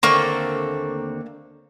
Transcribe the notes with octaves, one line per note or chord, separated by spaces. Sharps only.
D#2 D3 A3 A#3 C4 C#6